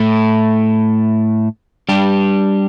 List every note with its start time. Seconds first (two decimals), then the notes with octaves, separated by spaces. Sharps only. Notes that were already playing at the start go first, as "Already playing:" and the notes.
Already playing: A2 A3 E4
1.89 G3 D4 G4